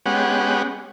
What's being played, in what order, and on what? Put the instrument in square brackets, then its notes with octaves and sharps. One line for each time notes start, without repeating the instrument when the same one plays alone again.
[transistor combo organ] G#3 B3 C#4 G4 F#5